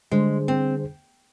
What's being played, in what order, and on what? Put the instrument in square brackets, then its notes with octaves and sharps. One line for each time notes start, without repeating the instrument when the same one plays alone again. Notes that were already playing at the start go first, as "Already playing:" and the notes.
[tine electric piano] D3 G3 D4 G#4 C5 [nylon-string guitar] G#3
[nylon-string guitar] C4